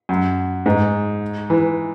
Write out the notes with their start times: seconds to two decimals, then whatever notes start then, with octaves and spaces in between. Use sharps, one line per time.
0.09 F#2
0.66 G#2
1.50 E3